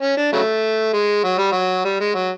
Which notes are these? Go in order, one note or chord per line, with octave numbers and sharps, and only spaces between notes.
C#4
D4
C#3 F#3 A3
G#3
F#3
G3
F#3
G3
G#3
F#3